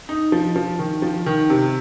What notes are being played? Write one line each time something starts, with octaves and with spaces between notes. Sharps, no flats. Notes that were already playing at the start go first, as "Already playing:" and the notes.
D#4
F3
F3
D#3
F3
D#3
C3